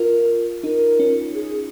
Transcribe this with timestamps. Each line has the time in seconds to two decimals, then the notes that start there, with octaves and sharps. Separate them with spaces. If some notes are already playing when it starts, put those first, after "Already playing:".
Already playing: F4 A#4
0.63 D#4 A#4
0.99 C#4
1.35 G#4